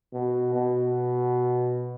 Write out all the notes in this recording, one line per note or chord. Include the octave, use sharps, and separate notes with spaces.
B2
B2